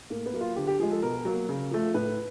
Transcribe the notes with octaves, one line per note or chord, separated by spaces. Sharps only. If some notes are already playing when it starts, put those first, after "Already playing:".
A2 A#3
B3
F#3 A#3
F4
D3 G4
G4
F3 G#3 G#4
A4
B2 A#4
F#3 A#3
C#3
F3 A3
A2 B4